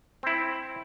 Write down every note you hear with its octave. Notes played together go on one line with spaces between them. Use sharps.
C4 E4